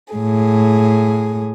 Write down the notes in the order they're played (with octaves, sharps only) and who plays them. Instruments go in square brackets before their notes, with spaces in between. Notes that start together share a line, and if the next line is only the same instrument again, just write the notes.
[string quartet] A2 G#4